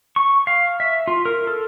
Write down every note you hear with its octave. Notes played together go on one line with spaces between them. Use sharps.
C#6
F5
E5
F4
A#4
A4